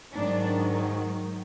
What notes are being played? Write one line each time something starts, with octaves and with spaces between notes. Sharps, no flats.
G#2 D#3 F#3 D4